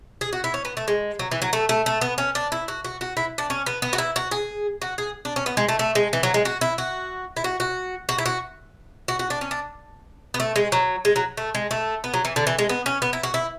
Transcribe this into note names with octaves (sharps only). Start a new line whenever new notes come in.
G#4
F#4
E4
C#4
B3
A3
G#3
F#3
E3
F#3
A3
A3
A3
B3
C#4
D4
E4
F#4
F#4
F#4
E4
D4
C#4
B3
B3
F#4
E4
F#4
G#4
F#4
G#4
D4
C#4
B3
G#3
A3
A3
G#3
E3
F#3
G#3
F#4
E4
F#4
E4
F#4
F#4
F#4
E4
F#4
F#4
F#4
D4
C#4
D4
B3
A3
G#3
F#3
G#3
F#3
A3
G#3
A3
B3
F#3
E3
D3
E3
G#3
B3
C#4
B3
E4
F#4
E4